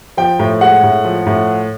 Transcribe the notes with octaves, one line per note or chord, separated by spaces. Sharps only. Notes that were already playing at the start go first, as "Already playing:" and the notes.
F3 G5
A2
G#3 F#5
A2
F3
A2